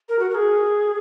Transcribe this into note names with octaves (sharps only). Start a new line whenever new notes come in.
A#4
F#4
A#4
G#4